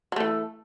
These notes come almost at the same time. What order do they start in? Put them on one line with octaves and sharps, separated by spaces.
F#3 A3 E3